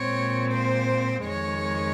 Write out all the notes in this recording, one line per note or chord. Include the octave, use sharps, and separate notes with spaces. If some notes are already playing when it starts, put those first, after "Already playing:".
Already playing: A#2 G#3 C4 C#5
C5
F2 D#3 G#3 C#5